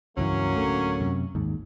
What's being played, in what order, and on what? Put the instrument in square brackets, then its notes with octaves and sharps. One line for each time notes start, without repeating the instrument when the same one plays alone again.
[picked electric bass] C#2 G2 E3 [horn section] F#3 A#3 C#4
[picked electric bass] D1 D3 A3
F#2 C3
G#1 D#2 G#2